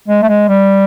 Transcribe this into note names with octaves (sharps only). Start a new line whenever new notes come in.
G#3
A3
G#3
G3